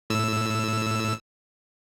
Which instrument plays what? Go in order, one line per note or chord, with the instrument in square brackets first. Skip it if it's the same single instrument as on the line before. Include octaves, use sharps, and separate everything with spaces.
[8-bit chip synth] A2 E6